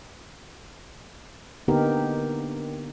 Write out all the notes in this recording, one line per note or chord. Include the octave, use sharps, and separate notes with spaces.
D3 A#3 B3 D#4 G4 A#4